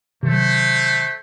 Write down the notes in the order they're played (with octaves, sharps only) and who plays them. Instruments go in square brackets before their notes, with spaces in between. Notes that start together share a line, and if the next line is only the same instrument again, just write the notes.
[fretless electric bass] C3 D#3 F#3 [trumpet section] A3 C5